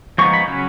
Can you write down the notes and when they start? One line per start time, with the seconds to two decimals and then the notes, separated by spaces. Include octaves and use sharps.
0.18 F3 G#3 B3 D#4 C#6
0.34 B5
0.47 C#3 F#3 C#4